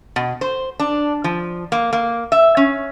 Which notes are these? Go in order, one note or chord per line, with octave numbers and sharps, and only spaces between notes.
B2
C5
D4
F3
A#3
A#3
E5
C#4